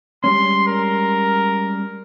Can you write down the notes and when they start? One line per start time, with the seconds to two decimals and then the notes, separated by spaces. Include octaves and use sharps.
0.24 G3 G#3 C#4 C6
0.68 A#4